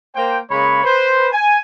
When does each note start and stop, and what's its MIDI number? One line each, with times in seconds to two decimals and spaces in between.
0.15 0.38 58
0.15 0.38 72
0.15 0.38 79
0.51 0.84 49
0.51 0.84 56
0.51 0.84 58
0.51 0.84 73
0.51 0.84 83
0.85 1.27 71
0.85 1.27 72
1.32 1.58 80